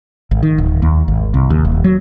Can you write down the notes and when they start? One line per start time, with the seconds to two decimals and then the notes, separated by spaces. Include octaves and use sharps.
0.31 G#1
0.43 D#3
0.58 D1
0.82 D#2
1.08 G#1
1.34 C2
1.50 D#2
1.65 D#1
1.84 F#3